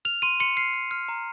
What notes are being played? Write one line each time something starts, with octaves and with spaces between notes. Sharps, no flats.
F6 F7
C6 D#7
C6 C#7
F6 C7
F6
F6
A#5